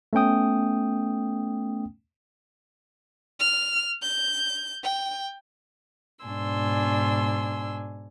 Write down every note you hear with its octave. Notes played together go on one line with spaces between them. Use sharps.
A3 B3 C#4 G5 D#6
F6
G6
G5
G#2 B2 D4 G#5 C6 E6